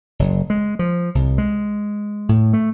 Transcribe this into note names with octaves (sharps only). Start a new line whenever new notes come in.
F#1
G#3
F3
C2
G#3
A2
A3